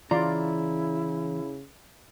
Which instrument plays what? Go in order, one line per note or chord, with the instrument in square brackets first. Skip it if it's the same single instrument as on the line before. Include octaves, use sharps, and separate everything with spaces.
[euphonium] C#3 [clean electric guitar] E3 A#5 [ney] E4 [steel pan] F4 D5 C6